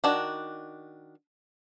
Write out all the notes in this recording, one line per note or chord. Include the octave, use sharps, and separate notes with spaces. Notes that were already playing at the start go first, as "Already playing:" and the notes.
D#3 D4 F#4